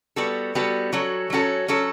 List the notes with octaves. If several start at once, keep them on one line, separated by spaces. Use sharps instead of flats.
G3 B3 F#4 A4
G3 B3 F#4 A4
F#3 C#4 F#4 A4
F#3 C#4 F#4 A4
F#3 C#4 F#4 A4